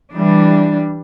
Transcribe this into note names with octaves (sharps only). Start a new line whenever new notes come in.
E3 G3 D4